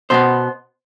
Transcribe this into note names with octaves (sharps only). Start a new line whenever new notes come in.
B2 B3 C5